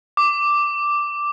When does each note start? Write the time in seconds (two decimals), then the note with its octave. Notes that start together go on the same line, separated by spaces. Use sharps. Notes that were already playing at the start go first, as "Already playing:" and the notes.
0.17 D6